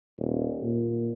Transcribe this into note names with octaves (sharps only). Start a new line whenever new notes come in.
D#1
A#2